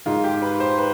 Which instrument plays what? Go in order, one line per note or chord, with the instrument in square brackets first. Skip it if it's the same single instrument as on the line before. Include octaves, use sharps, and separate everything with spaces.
[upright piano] G#2 D#3 F4
G4
B4
C5
B4